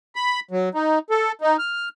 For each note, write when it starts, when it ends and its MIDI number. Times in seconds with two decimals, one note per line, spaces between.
0.16 0.40 83
0.51 0.69 54
0.75 0.99 63
1.10 1.32 69
1.41 1.57 63
1.59 1.89 89